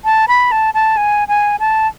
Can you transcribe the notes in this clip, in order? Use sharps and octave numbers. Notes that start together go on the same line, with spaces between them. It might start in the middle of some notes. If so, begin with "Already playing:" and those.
A5
B5
A5
A5
G#5
G#5
A5